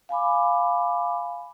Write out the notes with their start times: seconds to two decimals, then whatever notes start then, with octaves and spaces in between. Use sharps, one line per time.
0.09 F5 G#5 B5 D6